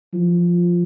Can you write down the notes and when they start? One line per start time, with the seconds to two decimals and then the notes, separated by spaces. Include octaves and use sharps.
0.14 F3